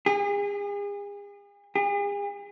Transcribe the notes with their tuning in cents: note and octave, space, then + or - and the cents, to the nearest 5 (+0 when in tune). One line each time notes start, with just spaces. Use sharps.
G#4 -40
G#4 -45